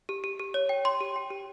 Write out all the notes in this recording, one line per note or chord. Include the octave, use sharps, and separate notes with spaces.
G4
G4
G4
C#5
G5
C#5 C6
G4
G5
G4